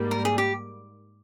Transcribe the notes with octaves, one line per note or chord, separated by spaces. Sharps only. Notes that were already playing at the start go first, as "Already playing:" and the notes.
Already playing: G#2 G3 A#3
A#4
G#4
G4